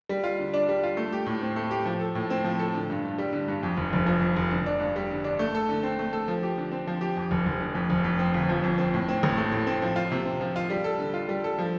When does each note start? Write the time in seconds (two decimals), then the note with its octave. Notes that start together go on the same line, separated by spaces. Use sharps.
0.09 G3
0.24 F4
0.39 D3
0.54 D4
0.69 G3
0.83 F4
0.97 A3
1.12 G4
1.26 A2
1.42 C4
1.56 A3
1.71 G4
1.86 F3
2.00 A4
2.15 A2
2.30 C4
2.44 F3
2.59 A4
2.75 D3
2.90 G2
3.04 G2
3.18 G3
3.33 D3
3.48 G2
3.63 F2
3.77 F1
3.93 F1
4.06 F3
4.21 F2
4.36 F1
4.51 D3
4.66 D4
4.80 G2
4.96 G3
5.11 D3
5.24 D4
5.39 A3
5.55 A4
5.69 D3
5.83 C4
5.99 A3
6.13 A4
6.28 F3
6.43 G4
6.58 D3
6.72 C4
6.87 F3
7.01 G4
7.17 F2
7.31 F1
7.46 F1
7.60 D3
7.75 F2
7.90 F1
8.04 F2
8.19 C4
8.34 G1
8.49 F3
8.64 F2
8.78 C4
8.94 A2
9.08 C4
9.23 A1
9.37 A3
9.52 A2
9.67 C4
9.82 F3
9.96 F4
10.12 C3
10.25 C4
10.41 F3
10.56 F4
10.70 G3
10.84 A4
10.99 D3
11.14 F4
11.29 G3
11.44 A4
11.58 F3